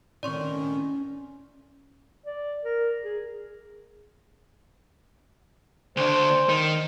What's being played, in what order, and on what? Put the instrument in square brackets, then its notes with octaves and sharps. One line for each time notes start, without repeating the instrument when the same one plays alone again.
[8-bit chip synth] A2 D#3 [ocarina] C4 [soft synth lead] C#4 [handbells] D5 C6 C#6
[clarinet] D5
A#4
G#4
[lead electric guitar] D2 D4 [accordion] C5
[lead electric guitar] D#3